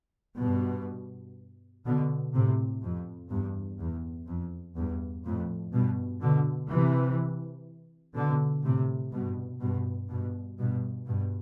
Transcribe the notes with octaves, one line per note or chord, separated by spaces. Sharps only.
G2 B2
B2 D3
A2 C3
F2
E2 G2
E2
F2
E2 G2
F2 A2
G2 B2
B2 D3
C3 E3
B2 D3
A2 C3
G2 B2
G2 B2
G2 B2
G2 B2
G2 B2